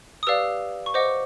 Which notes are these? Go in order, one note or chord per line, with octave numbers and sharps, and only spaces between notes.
D#6
G4 B4 D5 F5 E6
C#6
C5 D#5 F#5 D6